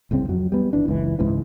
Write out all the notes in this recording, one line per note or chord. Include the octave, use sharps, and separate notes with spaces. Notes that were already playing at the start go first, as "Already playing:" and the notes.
D1 C2 C#3 C4
F2 F#3
G3 B3
G1 E3 D4
F#1 C#2 C#3 E3
C#2 G#2 C#3 E3